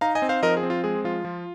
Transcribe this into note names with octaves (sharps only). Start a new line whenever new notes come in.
D#4 F5 A#5
D#5 G#5
C4
C5 F5
F3 A#4 D#5
G#4
C4
F4
G#3 G#4
F3 F4
F3